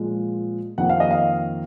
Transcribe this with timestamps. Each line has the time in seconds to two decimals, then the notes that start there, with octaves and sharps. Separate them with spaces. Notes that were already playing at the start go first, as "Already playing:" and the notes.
Already playing: A#2 F3 G#3
0.78 F2 D#3 A#3 F#5
0.89 F5
1.00 D#5
1.11 F5